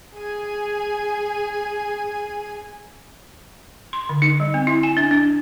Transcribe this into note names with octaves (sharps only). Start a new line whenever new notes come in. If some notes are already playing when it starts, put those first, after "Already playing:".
G#4 G#5
C6
D3
D#4
G3
C4
E4
G#5
D4
D4